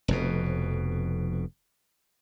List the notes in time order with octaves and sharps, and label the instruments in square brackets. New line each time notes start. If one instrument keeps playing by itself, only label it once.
[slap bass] F1 F2 B2